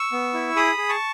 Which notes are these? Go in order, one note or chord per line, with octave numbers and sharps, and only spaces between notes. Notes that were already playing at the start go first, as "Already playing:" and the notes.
Already playing: C#6 E6
B3
E4
G#4 B5 D#6
G#4
A5 C#6